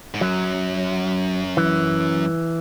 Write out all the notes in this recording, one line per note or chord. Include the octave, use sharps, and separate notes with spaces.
G#2
F#2 F#3
E3